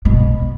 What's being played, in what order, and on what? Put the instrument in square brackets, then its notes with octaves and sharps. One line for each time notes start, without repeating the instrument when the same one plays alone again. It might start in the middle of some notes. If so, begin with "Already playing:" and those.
[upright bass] B2